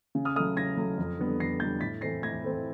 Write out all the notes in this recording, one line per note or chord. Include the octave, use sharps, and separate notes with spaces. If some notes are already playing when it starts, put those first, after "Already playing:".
C#3
D#6 F6
F#3 A3 D#6 F6
C#3 G#6 A#6
F#3 A3
F2
D3 G3 B3
F2 A#6 C7
D3 G3 B3 G6 A6
A2 A6 B6
E3 A3 C4 A#6 C7
A2 G#6 A#6
E3 A3 C4